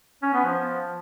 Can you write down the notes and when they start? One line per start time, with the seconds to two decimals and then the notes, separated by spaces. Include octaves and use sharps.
0.22 C#4
0.34 B3
0.45 F3